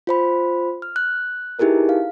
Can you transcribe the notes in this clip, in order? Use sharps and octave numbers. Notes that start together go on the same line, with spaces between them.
F4 C5 B5
F6
F#6
D#4 E4 G4 G#4 A#4 B4
F5